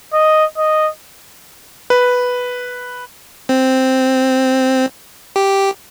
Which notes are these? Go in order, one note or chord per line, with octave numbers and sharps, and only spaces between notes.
D#5
D#5
B4
C4
G4